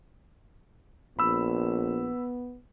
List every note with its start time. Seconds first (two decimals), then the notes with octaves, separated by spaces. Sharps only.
1.19 A#1 B3 B5 E6